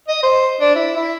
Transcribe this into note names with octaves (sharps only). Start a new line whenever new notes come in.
D#5
C5
D4
E4
E4